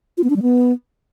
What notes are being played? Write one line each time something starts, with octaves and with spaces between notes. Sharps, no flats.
F4
B3
D4
G3
B3